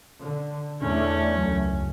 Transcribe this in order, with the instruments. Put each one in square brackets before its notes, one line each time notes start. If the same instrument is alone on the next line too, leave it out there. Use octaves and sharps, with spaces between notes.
[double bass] D3
[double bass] E2 A3 [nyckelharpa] C#4 [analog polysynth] D4
[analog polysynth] C#2 F#2